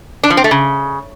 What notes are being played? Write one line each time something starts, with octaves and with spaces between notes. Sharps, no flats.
D4
F3
C4
A3
C#3